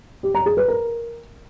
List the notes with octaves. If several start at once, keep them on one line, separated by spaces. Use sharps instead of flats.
G4
A#5
G#4
B4
A#4